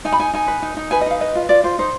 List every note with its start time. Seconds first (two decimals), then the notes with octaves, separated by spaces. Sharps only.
0.05 D#4 G#5
0.12 B5
0.19 D#4 G#5
0.33 D#4 G#5
0.48 B4
0.62 D#4
0.77 D#4
0.91 B4 G#5
1.01 D#5
1.06 D#4 F5
1.21 B4 D#5
1.35 F4
1.49 F4 D5
1.64 F4 C5
1.79 D#4 C5